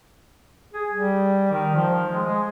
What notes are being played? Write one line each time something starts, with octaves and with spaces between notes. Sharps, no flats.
G#4
G3
D#3
F3
G#3
G#3